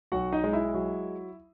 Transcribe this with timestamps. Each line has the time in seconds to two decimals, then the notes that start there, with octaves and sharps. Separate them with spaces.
0.12 B1 F#4 F#5
0.32 D#4 D#5
0.44 G#3
0.53 E4 E5
0.74 F#3